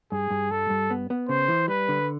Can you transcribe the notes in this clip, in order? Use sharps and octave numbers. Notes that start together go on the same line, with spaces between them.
G2 G#4
G2
G3 A4
G2
B3
B3
C#3 C5
E3
G3 B4
D3